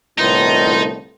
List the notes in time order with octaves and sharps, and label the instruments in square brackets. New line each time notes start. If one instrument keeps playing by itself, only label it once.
[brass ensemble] G1 C2 A2 [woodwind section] E3 F4 [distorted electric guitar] D#4